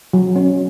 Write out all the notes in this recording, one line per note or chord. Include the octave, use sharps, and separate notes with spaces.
F#3
C#4